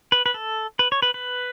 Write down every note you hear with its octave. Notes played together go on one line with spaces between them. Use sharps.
B4
B4
A4
B4
C#5
B4
B4